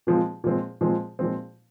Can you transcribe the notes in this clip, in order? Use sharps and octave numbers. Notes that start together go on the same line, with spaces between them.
A#2 F3 G#3 C4
A#2 F3 G#3 C4
A#2 F3 G#3 C4
A#2 F3 G#3 C4